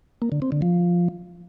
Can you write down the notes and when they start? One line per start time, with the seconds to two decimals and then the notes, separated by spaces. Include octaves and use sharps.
0.22 A#3
0.32 D3
0.42 C4
0.52 D3
0.62 F3